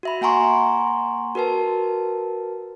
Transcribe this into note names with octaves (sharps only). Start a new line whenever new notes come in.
F#4 E5 B5
A#3 F#5 G#5 A#5 C6 C#6
F#4 A#4 B4 A5